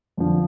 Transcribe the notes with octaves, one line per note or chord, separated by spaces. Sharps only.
F2 D3 F3